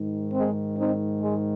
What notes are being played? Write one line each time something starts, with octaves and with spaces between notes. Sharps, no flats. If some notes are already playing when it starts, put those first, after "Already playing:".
Already playing: G#2 D#3
G#3 C4
C4 D#4
G#3